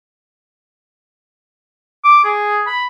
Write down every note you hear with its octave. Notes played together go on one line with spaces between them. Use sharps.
D6
G#4
B5